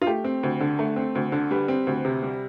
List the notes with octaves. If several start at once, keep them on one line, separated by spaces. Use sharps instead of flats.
F4
A3 G4
C4
D2
D3
A3
C4
D2
D3
G3 B4
C4
D2
C3
G3